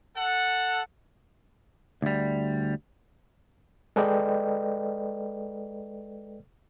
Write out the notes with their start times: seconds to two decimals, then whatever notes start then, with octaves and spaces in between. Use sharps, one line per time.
0.17 A4 F#5
2.02 D2 G3
3.96 G#3 A4 B4 D5 D#5 G5